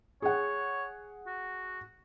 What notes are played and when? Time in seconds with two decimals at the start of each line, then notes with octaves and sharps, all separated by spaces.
0.22 G#4 C#5 F#5
1.27 F#4